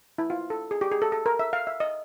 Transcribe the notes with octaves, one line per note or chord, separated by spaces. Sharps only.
E4
F4
A4
G#4
G4
G#4
A4
A4
A#4
E5
F5
E5
D#5